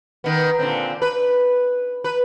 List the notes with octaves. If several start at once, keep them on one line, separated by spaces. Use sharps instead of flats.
D#3 B3
A#2 D3 C4
B4
B4